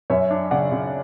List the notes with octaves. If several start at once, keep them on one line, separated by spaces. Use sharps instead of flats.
F#2 C#5 E5
D4
C#3 D5 F#5
C#3